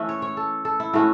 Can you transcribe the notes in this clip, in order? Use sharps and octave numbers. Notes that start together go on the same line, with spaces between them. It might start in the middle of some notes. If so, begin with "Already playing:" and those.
Already playing: E3 A3 C#4 E5
C#5
C#5
A4
A4
E4
A2 E3 A3 C#4 F#4